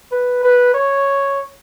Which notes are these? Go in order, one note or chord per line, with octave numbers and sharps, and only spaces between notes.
B4
B4
C#5